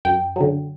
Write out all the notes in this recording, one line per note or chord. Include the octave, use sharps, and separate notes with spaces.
F#2 G5
D3 F#3